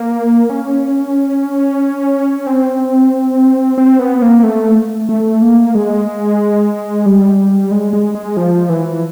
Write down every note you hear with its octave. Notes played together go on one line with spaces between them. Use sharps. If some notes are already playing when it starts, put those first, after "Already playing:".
Already playing: A#3
C#4
C4
C4
B3
A#3
A3
A3
A#3
G#3
G3
G#3
G#3
G#3
F3
E3